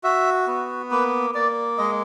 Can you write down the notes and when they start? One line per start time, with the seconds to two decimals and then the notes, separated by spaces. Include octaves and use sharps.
0.04 F#4 E5
0.48 B3
0.91 A#3 B4
1.35 A#3 D5
1.78 G#3 D#5